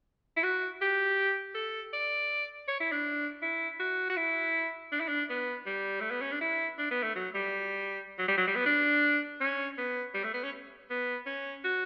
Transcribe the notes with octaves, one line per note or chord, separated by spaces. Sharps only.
E4
F#4
G4
A4
D5
C#5
E4
D4
E4
F#4
F#4
E4
D4
E4
D4
B3
G3
A3
B3
C#4
D4
E4
D4
B3
A3
F#3
G3
F#3
G3
F#3
G3
B3
D4
C#4
B3
G3
A3
B3
C#4
B3
C#4
F#4